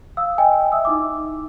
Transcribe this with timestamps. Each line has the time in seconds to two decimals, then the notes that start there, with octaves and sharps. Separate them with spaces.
0.17 F5 D#6 E6
0.38 D#5 G5 G#5
0.72 E5 D#6 E6
0.85 D#4 E4 D6